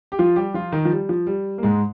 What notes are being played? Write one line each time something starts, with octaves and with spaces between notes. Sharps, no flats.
G4
F3 F4
G3 G4
F3 F4
D#3 D#4
F3
G3
F3
G3
A#3
G#2 G#3